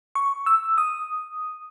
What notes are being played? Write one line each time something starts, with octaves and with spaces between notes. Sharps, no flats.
C#6
E6
D#6